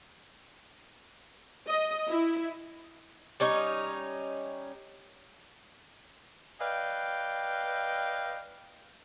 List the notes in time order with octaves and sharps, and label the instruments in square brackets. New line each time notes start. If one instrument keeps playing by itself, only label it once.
[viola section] D#5
E4
[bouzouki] G3 C#4 D#4 C#5
[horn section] B4 D5 D#5 F5 G5